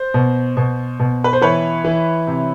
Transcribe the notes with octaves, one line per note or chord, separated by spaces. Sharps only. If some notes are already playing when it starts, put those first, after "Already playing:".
Already playing: C5
B2
B2
B2
B4
C5
E3 B4 C#5
E3
C3